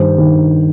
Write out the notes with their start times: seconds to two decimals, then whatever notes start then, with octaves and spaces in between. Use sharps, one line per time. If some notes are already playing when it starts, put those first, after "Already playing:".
Already playing: G2 D#3 C5
0.18 D#3